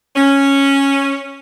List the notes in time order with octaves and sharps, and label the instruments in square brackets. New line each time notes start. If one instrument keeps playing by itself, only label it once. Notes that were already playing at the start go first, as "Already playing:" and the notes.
[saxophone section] C#4